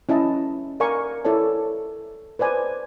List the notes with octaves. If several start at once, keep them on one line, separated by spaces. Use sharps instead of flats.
C#4 E4 D#5 A5
A#4 D5 F5 G#5 C#6
E4 A4 C#5 D5 A5
B4 C5 D5 G#5